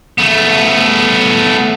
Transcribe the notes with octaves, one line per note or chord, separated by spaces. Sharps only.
A3 B3